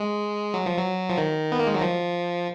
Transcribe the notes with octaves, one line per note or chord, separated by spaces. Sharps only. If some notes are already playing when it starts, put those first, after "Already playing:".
Already playing: G#3
F#3
F3
F#3
F3
D#3
B3
A#3
G#3
F#3
F3